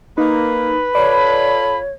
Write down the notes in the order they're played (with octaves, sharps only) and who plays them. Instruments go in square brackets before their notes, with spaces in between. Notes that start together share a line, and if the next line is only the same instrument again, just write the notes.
[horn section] A#3 [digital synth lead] D#4 [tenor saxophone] B4
[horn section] F4 A4 B5 [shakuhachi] C#5 [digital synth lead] D5